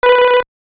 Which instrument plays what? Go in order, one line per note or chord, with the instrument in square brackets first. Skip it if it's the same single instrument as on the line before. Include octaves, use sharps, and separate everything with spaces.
[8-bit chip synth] B4